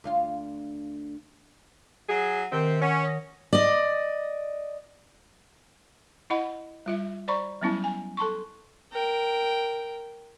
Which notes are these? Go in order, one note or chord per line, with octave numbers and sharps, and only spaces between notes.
D2 F4 F5
F#3 G#4
C3 D#3 C4 A#4 G6
C#4 F#5
C#5 D#6 A#6
D5 D#5
E4 D#5 F#5 B5
G3 F4 E5
C5 D5 A#5 B5 C#6
F#3 G3 B3 C#4 E4 A5
G#5
A4 A5 C6 C#6
A#4 G5